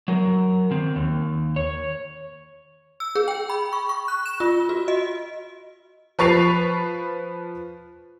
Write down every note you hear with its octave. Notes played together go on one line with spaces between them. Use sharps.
F#3 A#4
D#3 C4
D#2
C#5
E6
G#4
G5
B5
C#6
C#6
F#6
E7
F4
F#4
D#5
F3 B4 C#6 A6 C7 F7